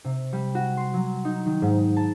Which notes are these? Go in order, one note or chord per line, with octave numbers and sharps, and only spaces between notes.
C3
G3
F#4
C6
F#3
D#4
D#3
G#2
A5